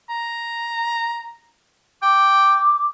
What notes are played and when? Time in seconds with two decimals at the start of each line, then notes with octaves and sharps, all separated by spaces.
0.10 A#5
2.02 G5 D6